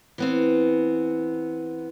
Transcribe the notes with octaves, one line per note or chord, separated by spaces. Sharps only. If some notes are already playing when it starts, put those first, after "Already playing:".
E3 B3 C4